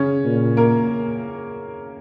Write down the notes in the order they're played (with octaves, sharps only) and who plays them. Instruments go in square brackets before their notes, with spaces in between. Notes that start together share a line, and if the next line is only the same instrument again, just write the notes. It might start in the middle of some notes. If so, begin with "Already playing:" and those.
Already playing: [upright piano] C#3 C#4
[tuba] A#2
[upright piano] A#3 A#4